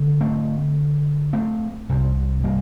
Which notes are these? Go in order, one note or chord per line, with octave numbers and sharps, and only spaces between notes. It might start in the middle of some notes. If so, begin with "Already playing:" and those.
Already playing: D3
A3 C4
A3 C4
C2 C3
G3 A#3